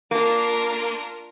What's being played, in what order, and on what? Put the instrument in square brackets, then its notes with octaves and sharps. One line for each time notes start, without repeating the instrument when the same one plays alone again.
[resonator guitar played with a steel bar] A#3 [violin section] D4 F4 A#4